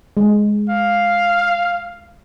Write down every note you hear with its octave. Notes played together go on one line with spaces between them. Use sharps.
G#3
F5